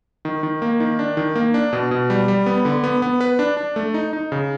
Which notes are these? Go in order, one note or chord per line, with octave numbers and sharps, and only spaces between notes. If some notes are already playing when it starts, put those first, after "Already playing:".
D#3
D#3
A#3
D#3
D4
D#3
A#3
D4
B2
B2
G3
G3
B3
D3
B3
B3
B4
D4
D4
A3
D#4
D#4
C#3